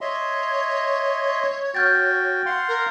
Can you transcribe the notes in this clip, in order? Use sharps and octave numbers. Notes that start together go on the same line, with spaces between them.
C#5 D#5 E5 C6
F#4 G5 F6 G6 A6
F5 F#5 C6
A#4